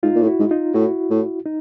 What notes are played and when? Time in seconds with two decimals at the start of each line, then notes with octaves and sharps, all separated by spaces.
0.03 G#2 D#4 F4
0.15 A#2
0.21 A2
0.27 E4 F#4
0.39 G#2
0.51 D#4 F4
0.74 A2 E4 F#4
1.10 A2
1.46 D#4